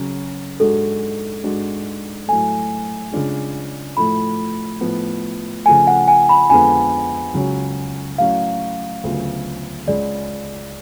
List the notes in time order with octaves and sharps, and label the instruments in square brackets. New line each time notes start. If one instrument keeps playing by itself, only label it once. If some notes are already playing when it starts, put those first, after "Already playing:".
Already playing: [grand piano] C#3 F#3 C#4
[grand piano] G#2 G#3 D4 F#4 [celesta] A4
[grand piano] G#2 G#3 D4 F#4
[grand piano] A2 F#3 A3 [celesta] G#5
[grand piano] C#3 G#3 D4 F4
[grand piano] A2 F3 A3 [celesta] B5
[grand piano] A2 F3 B3
[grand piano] C#3 F3 A3 [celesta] G#5
[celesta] F#5
G#5
B5
[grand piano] F2 D3 G#3 B3 F4 [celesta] G#5
[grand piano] C#2 C#3 F#3 C#4 F#4
[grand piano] A2 F#3 C#4 F#4 [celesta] F5
[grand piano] D2 C#3 F#3 B3 F4
[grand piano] C#2 C#3 G#3 [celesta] D5